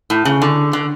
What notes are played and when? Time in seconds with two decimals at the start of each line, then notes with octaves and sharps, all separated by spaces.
0.10 A2
0.25 C#3
0.42 D3
0.73 D3